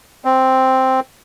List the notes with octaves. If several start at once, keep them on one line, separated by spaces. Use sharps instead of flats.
C4